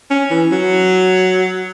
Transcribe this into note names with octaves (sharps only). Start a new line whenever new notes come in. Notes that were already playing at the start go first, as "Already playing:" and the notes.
C#4
E3
F#3